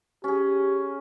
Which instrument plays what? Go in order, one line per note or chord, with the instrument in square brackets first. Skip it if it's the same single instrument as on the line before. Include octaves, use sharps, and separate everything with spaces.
[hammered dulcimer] C#4 G#4 [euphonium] G4